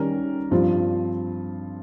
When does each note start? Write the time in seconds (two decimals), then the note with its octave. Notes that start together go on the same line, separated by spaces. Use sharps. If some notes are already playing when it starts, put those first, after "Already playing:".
Already playing: D#3 G3 C#4 G4 A#4
0.51 G2 F3 C4 F4